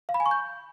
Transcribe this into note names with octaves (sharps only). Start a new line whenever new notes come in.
F5
B5
G#5
C#6
G6